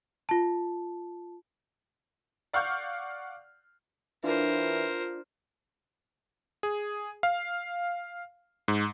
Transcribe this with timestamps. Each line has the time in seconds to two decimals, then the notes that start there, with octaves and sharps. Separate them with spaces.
0.29 F4 A5
2.53 D5 F5 F#5 C#6 F6 G6
4.24 E3 D4 F4 A#4 C5
6.63 G#4
7.23 F5
8.68 G#2